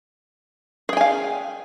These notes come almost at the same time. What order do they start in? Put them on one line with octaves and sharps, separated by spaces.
G#4 G5 G#5 F5